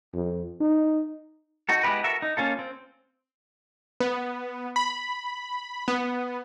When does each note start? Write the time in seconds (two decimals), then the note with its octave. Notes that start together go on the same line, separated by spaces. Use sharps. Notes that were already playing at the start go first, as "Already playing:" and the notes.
0.14 F2
0.60 D#4
1.69 D#4 F#4 A4
1.83 G#3 B3 E4 G4 B4
2.04 F#4 A4 A#4 E5
2.22 D#4
2.37 A#3 C#4 F4 A4
2.59 C4
4.00 B3
4.76 B5
5.88 B3